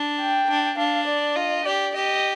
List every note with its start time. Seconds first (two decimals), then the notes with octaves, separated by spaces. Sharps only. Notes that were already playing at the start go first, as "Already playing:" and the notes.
Already playing: D4
0.21 G5
0.49 D4
0.78 D4 F5
1.07 D5
1.36 F4 D#5
1.64 G4 D5
1.94 G4 D#5